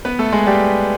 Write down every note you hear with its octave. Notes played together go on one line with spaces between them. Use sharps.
B3 B4
A3 A4
G#3 G#4
G3 G4